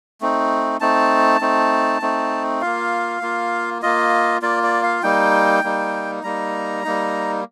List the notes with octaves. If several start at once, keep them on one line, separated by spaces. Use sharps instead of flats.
A3 C4 D#4
A3 C4 D#4 A5
A3 C4 D#4
A3 C4 D#4
A#3 F4 F5
A#3 F4
A#3 F4 D#5
A#3 F4 D5
D5
F5
G3 A#3 D#4 G5
G3 A#3 D#4
G3 A#3 D#4 A#5
G3 A#3 D#4